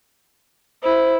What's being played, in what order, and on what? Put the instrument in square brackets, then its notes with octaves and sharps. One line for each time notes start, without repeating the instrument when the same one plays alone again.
[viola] E4 [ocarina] C5